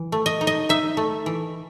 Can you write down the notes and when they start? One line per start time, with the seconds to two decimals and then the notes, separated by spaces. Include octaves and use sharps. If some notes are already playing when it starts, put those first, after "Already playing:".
Already playing: E3
0.12 A3
0.26 D#5
0.41 D#4
0.47 D#5
0.69 D#4 E5
0.97 A3
1.26 E3